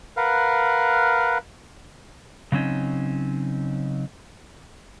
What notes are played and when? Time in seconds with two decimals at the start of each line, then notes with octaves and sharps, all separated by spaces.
0.17 A#4 B4 F5 F#5
2.52 C#3 F#3 C4 C#4 D#4